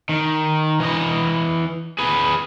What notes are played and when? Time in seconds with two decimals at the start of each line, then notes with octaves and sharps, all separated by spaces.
0.09 D#3
0.80 E3 D#5
1.99 G#4 B4